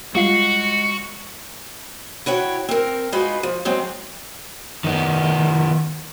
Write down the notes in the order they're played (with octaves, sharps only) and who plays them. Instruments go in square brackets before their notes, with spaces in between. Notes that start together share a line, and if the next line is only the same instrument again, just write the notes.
[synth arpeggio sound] G3 F4 C7 [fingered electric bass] G#3 [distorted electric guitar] F#4 [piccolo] C#7
[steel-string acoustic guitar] E4 F#4 C#5 G5
C4 A#4
G#3 D#4 F4 F#4 B4
F3
F#3 G#3 C4
[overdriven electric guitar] D#3 B3